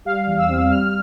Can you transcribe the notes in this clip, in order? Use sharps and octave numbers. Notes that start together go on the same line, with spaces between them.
G3 F5
E2
E6
C4
G3 F6